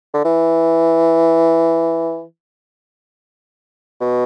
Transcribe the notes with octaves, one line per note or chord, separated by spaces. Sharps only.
D3
E3
B2